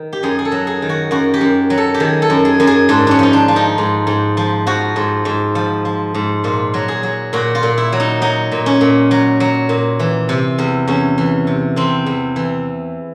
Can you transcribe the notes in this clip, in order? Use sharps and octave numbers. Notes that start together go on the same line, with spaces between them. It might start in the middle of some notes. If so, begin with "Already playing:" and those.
Already playing: D#3
G4
F#2 G#4
G#4
A4
F#3
G#4
D#3
F#4
F#2 F#4
G4
F#2
F#3
A4
G4
D#3 G#4
A4
F#2
G#4
F#2
G#4
G#2 D4
C#4 D4
F3 D#4
D4
F3
D#4
G#2
G#2
F3
F3 F#4
G#2
G#2
F3
F3
G#2
A#2 F4
F#3
G#4
F#3
A#2 F#4
F4
A#2
E4
F#3
D#4
F#3 D#4
A#2
C#4
A#2
F#3
F#3
A#2
E3
C3
E2
E2 C#4
E3
C3
E2 C4
E2
E3